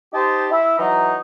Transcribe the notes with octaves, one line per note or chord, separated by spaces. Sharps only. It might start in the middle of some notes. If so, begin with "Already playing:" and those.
D#4 G4 C5 D#5 A5
E4 E5
E3 F#3 D#4